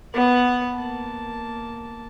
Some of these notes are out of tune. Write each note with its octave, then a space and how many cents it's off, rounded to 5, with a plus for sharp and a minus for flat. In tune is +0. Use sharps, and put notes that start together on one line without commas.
B3 +0 F#5 +0
A#3 +0 A5 +0